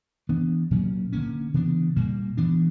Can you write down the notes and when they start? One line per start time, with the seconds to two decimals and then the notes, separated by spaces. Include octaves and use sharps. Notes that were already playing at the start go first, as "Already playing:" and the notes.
0.29 E3 B3 D4
0.71 A#2 F#3 A#3 C#4
1.12 D3 A#3 C#4
1.54 C#3 E3 B3 D4
1.96 A#2 G3 A#3
2.37 E3 B3 D4